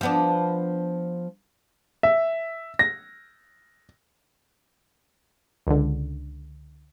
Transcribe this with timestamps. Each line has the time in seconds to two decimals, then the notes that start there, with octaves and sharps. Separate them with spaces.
0.01 F3 B3 D4
2.03 E5
2.79 A#6
5.67 C#2 D3